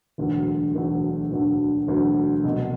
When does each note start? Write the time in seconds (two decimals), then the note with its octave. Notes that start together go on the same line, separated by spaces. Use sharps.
0.18 E1 D2 D3 F#3
0.75 E1 D2 D3 F#3
1.31 E1 D2 D3 F#3
1.88 E1 D2 D3 F#3
2.44 C2 B2 F#3